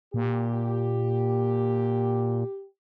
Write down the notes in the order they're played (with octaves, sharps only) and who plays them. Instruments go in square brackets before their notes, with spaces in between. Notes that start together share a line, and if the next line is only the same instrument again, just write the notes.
[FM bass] A#2 [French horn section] G4